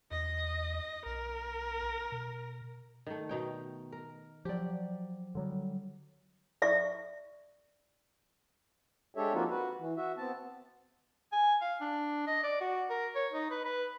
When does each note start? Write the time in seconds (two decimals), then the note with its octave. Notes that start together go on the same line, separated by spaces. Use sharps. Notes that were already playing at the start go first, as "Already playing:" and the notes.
0.11 E2 D#5
1.06 B1 A#4
2.12 B2
3.06 D#3 A3
3.29 B2 D#4 G5
3.92 A#4
4.45 F3 F#3 G4 D5
5.35 D3 F#3 G3
6.62 D5 E5 C#6
9.15 G#3 D4 G4 A4 C#5 E5
9.33 F3 A#3 C4 D#4 F4 F#4
9.50 F#4 B4
9.79 E3
9.97 F#4 E5
10.18 B3 C4 A5
11.32 G#5
11.62 F5
11.81 D4
12.27 D#5
12.43 D5
12.60 F#4
12.90 A#4
13.15 C#5
13.33 D#4
13.51 B4
13.65 B4